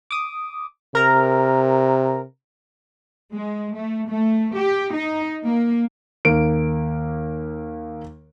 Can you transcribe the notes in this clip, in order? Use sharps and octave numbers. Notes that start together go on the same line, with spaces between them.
D6 D#6
C3 A#4 A#5
G#3
A3
A3
G4
D#4
A#3
D#2 A#3 D7